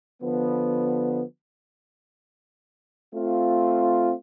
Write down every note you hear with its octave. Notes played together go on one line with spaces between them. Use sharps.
D3 F3 B3
A3 C4 F4